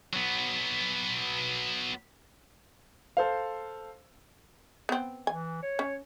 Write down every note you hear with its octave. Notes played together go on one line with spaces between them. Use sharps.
F#3 B3
A4 C5 F5
B3 C4
E3 G#5
C#5
C#4